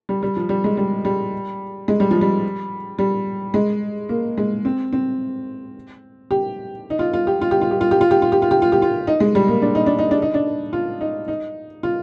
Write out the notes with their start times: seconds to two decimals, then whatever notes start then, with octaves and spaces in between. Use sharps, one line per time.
0.09 G3
0.23 G3
0.37 F3
0.49 G3
0.64 G#3
0.77 G3
1.05 G3
1.88 G#3
2.00 G3
2.11 F3
2.21 G3
2.99 G3
3.54 G#3
4.09 A#3
4.38 G#3
4.65 C4
4.93 C4
6.31 G4
6.90 D#4
6.99 F4
7.13 F4
7.27 G4
7.41 F4
7.51 G4
7.61 F4
7.71 G4
7.81 F4
7.91 G4
8.01 F4
8.11 G4
8.22 F4
8.32 G4
8.42 F4
8.51 G4
8.62 F4
8.72 G4
8.82 F4
9.07 D#4
9.20 G#3
9.35 G3
9.48 A#3
9.62 D4
9.75 D#4
9.86 D4
9.99 D#4
10.11 D4
10.22 D#4
10.34 D4
10.73 F4
11.01 D#4
11.28 D#4
11.83 F4